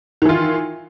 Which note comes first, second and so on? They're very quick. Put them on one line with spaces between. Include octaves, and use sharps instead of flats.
D#3 E3 F4